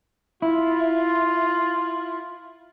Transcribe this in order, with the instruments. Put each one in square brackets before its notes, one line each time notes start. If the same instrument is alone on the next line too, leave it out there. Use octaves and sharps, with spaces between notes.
[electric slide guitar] E4 [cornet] F4